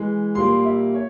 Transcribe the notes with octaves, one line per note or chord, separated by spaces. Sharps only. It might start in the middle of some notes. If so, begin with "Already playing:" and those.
Already playing: E3 G#3
A#2 G3 A#3 C6
E5
C#5